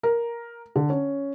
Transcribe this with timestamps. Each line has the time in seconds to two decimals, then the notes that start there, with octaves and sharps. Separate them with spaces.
0.03 A#4
0.76 D3
0.90 C#4